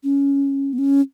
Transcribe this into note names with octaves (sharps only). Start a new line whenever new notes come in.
C#4
B3
C#4